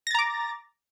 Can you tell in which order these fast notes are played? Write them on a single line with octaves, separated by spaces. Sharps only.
A#6 A6 A#5 D6